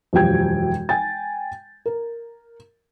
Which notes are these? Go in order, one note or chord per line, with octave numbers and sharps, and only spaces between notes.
E1 F#2 F3 G4 G5 G#6
G5 G#5 A6
A#4